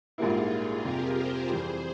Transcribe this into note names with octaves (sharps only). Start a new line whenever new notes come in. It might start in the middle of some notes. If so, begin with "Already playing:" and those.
A#1 G#2 G3 A#3 E4 F4 G#4
F2 C3 G3 G4 A#4
G#4 C5
F2 E3 G3 G#4 C5